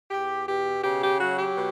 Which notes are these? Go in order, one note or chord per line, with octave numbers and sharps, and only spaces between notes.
E2 G4
B2 G4
C#3 G4
G4
F#3 F#4
G4
B2